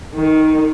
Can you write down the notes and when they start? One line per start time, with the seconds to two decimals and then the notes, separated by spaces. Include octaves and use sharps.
0.15 D#3